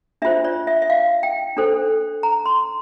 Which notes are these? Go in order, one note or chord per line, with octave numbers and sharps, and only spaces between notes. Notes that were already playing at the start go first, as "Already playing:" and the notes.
D4 F4 C5 E5
D5
E5
E5
F5
G5
D4 A4 C5
A#5
C6